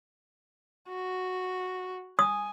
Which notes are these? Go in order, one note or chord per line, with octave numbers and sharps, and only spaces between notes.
F#4
G#5 D#6